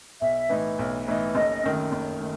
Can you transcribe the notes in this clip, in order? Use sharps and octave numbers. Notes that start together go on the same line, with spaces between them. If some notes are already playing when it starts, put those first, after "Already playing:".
B1 E5
A2 E3 B3 D#4
B1
A2 E3 B3 D#4
F#1 D#5
F#2 D#3 A3
F#1
D#3 A3